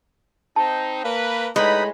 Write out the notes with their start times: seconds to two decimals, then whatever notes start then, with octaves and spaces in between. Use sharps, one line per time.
0.56 C4 D#4 A5
1.03 A#3 B4
1.56 A2 G#3 D#4 B4 B5 D#6